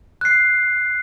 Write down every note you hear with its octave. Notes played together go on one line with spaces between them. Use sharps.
F#6 C7